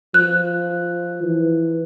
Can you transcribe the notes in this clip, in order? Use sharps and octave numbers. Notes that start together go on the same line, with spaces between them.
F3 F#6
E3